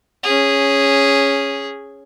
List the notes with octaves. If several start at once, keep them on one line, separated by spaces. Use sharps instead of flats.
C#4 G#4